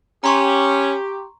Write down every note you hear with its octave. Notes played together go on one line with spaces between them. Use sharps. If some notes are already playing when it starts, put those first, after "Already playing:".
C#4 G4 A#5 C6 C#6